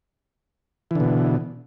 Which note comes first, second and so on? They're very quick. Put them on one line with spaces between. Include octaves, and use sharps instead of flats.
E3 D3 B2